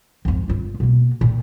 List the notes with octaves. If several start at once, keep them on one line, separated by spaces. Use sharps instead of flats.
G#1 F2
G1 F4
B2 A#3
A#2 D#3